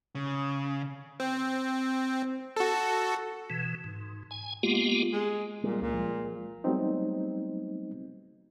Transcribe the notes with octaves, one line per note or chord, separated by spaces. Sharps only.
C#3
C4
F#4 A4
B2 E3
G#2
G#5
G#3 A#3 B3 F4 G4
G#3
A#2 G3 G#3
C#2 A#2
F3 G#3
F#3 G3 A3 B3 C4 D#4